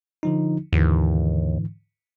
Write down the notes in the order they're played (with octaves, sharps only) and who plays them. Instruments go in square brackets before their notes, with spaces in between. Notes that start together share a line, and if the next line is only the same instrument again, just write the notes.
[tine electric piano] D3 F3 D#4
[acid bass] D#2 [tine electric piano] G#2 D3 E3